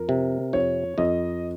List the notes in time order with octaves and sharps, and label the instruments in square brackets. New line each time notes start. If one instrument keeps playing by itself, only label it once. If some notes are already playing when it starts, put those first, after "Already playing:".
Already playing: [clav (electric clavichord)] F2 [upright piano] A#4
[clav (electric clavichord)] C3
[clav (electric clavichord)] F2 [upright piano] C#5
[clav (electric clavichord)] F2 [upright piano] D#5